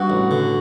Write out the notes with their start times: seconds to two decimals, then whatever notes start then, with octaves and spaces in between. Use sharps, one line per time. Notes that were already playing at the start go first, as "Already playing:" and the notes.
Already playing: G2 F#4
0.10 A1
0.31 D3